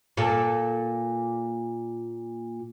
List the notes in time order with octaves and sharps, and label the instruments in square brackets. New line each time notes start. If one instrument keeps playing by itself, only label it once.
[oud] A#2 A4